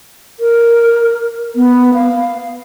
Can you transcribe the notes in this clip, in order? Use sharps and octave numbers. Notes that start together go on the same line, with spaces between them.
A#4
B3
F5